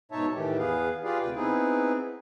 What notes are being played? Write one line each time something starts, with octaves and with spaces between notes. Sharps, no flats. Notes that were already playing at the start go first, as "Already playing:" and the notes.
G#2 B2 D#4 C#5 E5 A5
A2 D#3 E3 A3 G4
E2 B3 G#4 B4 F5
F4 G4 G#4 B4 D5 F5
D2 C3 B4 G5
B3 C4 D#4 E4 G#4 B4